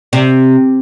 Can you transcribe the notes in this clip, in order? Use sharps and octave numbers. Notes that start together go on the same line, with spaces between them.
C3